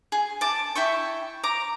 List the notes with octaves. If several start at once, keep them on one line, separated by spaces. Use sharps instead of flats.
G#4
A5 D6
E4 E5 G5 C#6
A#5 D6